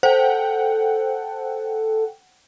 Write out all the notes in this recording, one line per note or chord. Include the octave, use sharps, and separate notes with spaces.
A4 C5 F#5 G5